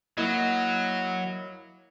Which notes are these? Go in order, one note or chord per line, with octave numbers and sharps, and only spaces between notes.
F#3 A#3 E4 D#5